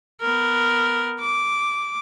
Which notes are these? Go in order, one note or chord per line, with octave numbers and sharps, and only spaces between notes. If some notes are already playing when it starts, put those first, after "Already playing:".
B3 A#4
D6